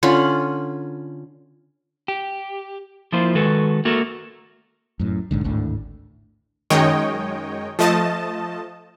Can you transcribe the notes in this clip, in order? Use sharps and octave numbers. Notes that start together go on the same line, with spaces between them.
D3 C#4 F4 B5
G4
F3 A#3 E4 F4 C5
D#3 G#3 F#4 A4 B4
A3 A#3 F#4 A4 A#4
F#2 A2
A#1 G#2 D3
G#1 D2 A2 D3
F#2 D#3 G#3 C#5 D#5 G5
F3 A3 D#5 A5